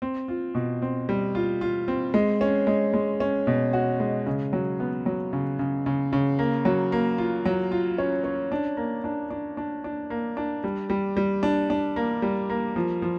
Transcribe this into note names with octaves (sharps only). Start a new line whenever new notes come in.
C4
F4
B2
C4
G3
F4
F4
C4
G#3
C#4
G#3
G#3
C#4
B2
F#4
G#3
C#3
F#3
B3
F#3
C#3
C#3
C#3
C#3
A#3
F#3
A#3
F4
F#3
F4
C#4
C#4
D4
A#3
D4
D4
D4
D4
A#3
D4
G3
G3
G3
D4
D4
A#3
G3
A#3
F3
F3